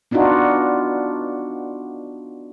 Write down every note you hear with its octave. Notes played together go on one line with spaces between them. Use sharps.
B3 D4 D#4 F4 F#4